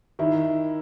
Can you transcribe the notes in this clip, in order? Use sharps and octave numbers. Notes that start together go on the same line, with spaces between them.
D#3 E4